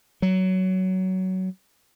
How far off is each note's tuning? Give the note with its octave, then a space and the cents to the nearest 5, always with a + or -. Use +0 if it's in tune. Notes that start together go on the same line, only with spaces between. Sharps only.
F#3 +15